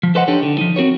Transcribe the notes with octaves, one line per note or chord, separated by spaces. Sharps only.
F3
A4 B4 C5 D#5 F#5
D4 D#4 G4 A4 C#5
D3
F3 D#4
C4 F#4 A#4 C#5